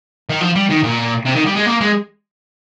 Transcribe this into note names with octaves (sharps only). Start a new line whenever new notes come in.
D#3
F3
G3
D#3
A#2
C3
D#3
G3
G#3
A#3
G#3